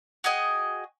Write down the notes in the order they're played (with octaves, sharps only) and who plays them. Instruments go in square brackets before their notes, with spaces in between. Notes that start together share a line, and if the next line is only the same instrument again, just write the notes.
[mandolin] F#4 G#4 D#5 G5